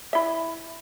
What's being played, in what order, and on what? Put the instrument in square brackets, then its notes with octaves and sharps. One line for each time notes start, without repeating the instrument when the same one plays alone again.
[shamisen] E4 E5